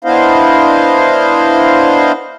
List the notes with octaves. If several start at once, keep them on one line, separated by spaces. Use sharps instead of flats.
B3 D4 E4 C5 D#5 F5